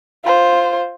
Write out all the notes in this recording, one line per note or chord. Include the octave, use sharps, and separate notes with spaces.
F4 C5